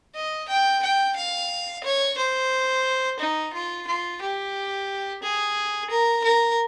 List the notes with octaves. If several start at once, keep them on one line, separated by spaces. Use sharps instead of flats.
D#5
G5
G5
F5
C#5
C5
D#4
F4
F4
G4
G#4
A#4
A#4